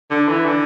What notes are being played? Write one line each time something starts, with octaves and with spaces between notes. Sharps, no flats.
D3
E3
D3